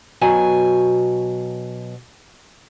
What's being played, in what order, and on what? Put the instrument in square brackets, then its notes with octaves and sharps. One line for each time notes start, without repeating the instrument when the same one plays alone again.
[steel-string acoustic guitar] B2 F#3 G#5